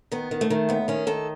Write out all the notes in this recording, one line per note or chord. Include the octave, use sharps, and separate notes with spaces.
D#3 B3
D#3
A3
D#3
D#2 B3
D#3 C#4
D#3 A4